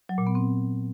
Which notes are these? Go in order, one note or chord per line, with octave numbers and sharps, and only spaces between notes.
F#3
A#2
B3
C4